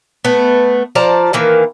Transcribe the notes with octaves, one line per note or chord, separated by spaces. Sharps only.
A3 B3
F3 D5 A5 A#5
D#3 E3 A#3